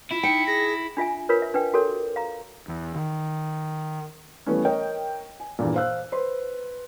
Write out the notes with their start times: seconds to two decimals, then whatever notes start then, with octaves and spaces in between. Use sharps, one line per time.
0.11 E4 F4
0.23 D#4 G5 C#7
0.47 G#4 A#6
0.97 D4 F4 E5 G#5
1.29 F4 A#4 B4 C#5
1.42 E5
1.54 D4 B4 G5
1.74 F#4 A4 A#4 C#5
2.16 F5 A#5
2.68 E2
2.96 D#3
4.46 E3 G3 A3 B3 C#4
4.65 A#4 C#5 D#5 G5
5.40 G#5
5.59 E2 G2 A#2
5.75 C5 F5 E6 F#6
6.12 B4 C5 C6